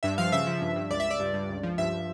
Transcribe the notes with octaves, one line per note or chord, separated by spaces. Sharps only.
G2 E5
F3 F5
C#3 E5
F3
G2
G2
C#2 D5
E5
C#2
D5
G2
G2
C#2
F3
G2 E5